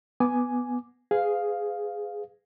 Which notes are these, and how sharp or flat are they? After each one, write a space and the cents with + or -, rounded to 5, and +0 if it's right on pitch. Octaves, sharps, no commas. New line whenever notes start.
B3 +0 G#5 +5 D6 -5
G#4 +0 B4 +45 F5 +0